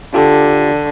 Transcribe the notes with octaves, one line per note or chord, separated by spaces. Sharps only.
D3 F4 G4 A4